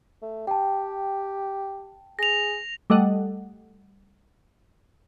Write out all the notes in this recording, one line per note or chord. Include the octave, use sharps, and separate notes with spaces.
A3
G4 G5 A5
G#4 A#6 F7
G3 A3 A4 D#5 F#5